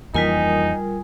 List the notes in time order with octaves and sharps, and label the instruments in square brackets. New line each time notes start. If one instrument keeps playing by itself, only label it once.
[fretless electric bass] F2 E3 A#3 [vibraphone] G3 F4 A#4 [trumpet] D#4 [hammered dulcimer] G#4